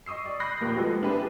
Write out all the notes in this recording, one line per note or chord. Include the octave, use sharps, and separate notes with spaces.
D#5 C#6 D#6 E6 C7
D5
B5 F#6 G6 A#6 C7
A#1 D#2 A#3 G5
B2 F3 G3 G#3 B3 A4
B3 D4 E4 G4 G#4 B4